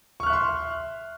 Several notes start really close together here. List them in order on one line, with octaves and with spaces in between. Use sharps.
C#6 F6 F#6 E5 C6